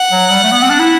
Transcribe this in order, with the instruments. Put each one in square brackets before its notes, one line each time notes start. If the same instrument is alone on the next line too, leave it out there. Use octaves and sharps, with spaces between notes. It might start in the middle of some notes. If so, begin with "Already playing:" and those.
Already playing: [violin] F#5
[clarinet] F#3
G3
A3
B3
C4
D4
E4